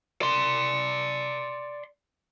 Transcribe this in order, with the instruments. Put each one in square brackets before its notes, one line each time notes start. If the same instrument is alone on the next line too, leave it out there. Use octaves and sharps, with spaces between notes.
[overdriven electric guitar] D5 C6